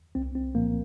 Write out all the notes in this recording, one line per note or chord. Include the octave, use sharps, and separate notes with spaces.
C2 C4
C4
A#2 F3 A#3